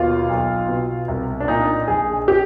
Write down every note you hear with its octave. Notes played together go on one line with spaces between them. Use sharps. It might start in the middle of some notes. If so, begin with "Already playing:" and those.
Already playing: D#2 B2 F4
B1
B2
C2
D4
A#2 D#4
A#1 G#4
G4